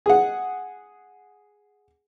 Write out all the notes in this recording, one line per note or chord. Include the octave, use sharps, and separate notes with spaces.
G#4 F#5